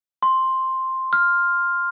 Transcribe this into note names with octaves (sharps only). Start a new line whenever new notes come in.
C6
F6